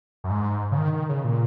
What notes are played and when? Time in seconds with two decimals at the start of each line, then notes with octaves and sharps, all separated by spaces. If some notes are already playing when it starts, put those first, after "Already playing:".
0.24 F#2
0.30 G#2
0.72 C#3
0.77 D#3
0.93 D#3
1.09 C#3
1.24 A#2